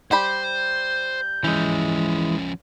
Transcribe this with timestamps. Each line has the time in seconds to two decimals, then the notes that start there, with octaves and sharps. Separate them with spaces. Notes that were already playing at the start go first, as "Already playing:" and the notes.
0.11 G3 G4 C5 B5 G6
1.44 E3 F3 G#3 C#4